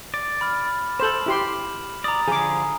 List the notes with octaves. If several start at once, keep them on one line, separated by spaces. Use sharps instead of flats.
D5
B5 F6
A4 C5 E7 F#7
E4 G4 C6
D5 A#5 D#6
D3 F3 G#4 G#5 D6